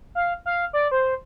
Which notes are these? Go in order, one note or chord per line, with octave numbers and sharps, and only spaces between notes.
F5
F5
D5
C5